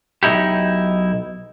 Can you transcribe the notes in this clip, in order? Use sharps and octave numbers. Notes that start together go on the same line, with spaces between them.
B1 D#4 E4 G4